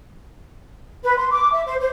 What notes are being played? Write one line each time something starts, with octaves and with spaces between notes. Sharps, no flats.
B4
C6
D6
E5
C5
C5